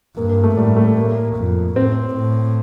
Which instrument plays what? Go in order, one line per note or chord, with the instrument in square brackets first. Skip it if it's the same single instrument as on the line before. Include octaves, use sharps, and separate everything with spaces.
[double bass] G2 [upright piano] A#3
[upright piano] A#3
A3
[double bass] A2 [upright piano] G3
[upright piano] A3
A#3
[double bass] F2
[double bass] A2 [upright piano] C4
[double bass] A2